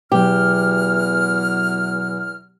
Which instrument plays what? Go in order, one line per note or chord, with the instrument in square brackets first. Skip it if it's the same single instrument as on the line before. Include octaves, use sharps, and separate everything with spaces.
[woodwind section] E2 F6 [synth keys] B2 F#3 [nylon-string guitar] G4